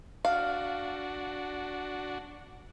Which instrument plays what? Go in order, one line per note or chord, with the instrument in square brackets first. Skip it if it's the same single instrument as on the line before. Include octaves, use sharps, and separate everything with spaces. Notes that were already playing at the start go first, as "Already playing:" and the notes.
[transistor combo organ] D4 F#4 [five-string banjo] F5